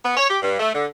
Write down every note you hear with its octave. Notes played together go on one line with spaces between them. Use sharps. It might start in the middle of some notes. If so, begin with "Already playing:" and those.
B3
C#5
G4
G2
A3
D3